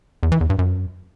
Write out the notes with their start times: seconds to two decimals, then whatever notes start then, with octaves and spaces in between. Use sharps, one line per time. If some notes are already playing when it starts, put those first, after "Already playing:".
0.23 E2
0.32 E3
0.41 E2
0.50 G2
0.59 F#2